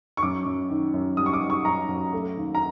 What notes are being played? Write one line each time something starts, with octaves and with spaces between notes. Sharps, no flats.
C#6
F#2 D6
F#2
D#3
F#2
G3 D#6
C#6
D6
G3
C#6
F#2 A#5
F#2
A3
D#2
A#5